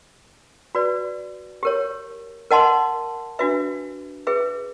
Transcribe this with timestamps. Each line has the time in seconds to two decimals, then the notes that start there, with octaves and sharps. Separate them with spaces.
0.75 F#4 B4 D5
1.63 G4 A#4 C#5
2.51 A#4 D#5 F#5 A5 C6
3.39 D4 F#4 B4 E5
4.27 G#4 B4 E5